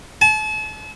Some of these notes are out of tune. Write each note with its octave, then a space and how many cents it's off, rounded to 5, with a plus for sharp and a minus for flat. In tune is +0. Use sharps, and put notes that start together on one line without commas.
A5 -40